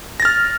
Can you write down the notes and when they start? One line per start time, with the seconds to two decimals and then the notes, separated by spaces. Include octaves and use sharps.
0.20 A#6
0.22 A6
0.25 F6